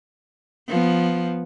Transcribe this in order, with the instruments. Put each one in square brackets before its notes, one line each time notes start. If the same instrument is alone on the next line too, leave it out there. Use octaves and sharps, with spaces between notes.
[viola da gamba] F3 B3